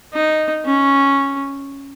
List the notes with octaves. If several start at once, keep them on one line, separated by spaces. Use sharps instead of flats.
D#4
C#4